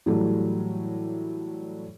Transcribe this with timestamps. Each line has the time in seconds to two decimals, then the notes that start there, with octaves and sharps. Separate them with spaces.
0.06 A2 E3 F#3 G3 A3